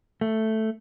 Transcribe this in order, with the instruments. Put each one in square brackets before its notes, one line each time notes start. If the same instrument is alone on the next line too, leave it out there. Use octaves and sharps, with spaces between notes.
[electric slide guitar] A3